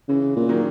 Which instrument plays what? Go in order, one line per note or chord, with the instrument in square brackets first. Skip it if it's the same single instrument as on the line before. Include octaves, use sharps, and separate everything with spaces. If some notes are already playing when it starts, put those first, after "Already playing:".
[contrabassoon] C#3 [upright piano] E3
[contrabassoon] A#2
[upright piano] D#3 F#3